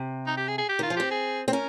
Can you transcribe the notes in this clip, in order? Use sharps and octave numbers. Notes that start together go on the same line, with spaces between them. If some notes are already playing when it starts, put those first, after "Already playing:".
Already playing: C3
D#4
G4
G#4
G#4
G4
D#3 F4
F3
C4 G4
G#4
C4
C#4 A#4